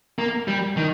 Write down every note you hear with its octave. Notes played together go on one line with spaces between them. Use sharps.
A#3
G3
D#3